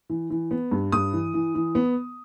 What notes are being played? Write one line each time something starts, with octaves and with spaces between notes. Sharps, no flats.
E3
E3
B3
G2
G2 D#6
E3
E3
E3
B3